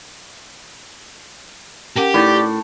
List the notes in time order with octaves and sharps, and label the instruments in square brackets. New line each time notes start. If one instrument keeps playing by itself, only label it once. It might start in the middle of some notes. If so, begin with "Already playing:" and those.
[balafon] C#4 A#4 F#5 [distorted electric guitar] G4
[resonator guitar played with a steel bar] A2 [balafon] D#4 [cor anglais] D5